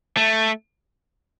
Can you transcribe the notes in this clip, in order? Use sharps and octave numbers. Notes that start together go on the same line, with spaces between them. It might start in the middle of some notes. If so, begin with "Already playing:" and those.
A3